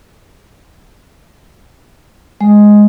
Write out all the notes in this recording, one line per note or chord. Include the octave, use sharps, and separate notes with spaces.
G#3